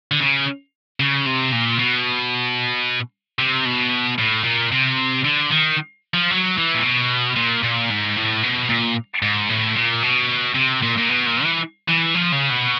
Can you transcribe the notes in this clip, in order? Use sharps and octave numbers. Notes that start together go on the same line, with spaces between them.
D3
C#3
C#3
C3
A#2
B2
C3
B2
A2
A#2
C3
D3
D#3
F3
F#3
E3
A#2
B2
A#2
A#2
G#2
A2
B2
A#2
G#2
A2
A#2
B2
C3
A#2
A#2
B2
A#2
E3
E3
F3
C#3
B2